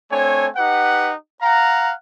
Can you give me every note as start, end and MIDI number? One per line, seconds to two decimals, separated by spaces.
0.12 0.48 57
0.12 0.48 60
0.12 0.48 62
0.12 0.48 73
0.12 0.48 80
0.56 1.12 63
0.56 1.12 67
0.56 1.12 71
0.56 1.12 78
1.41 1.93 77
1.41 1.93 78
1.41 1.93 82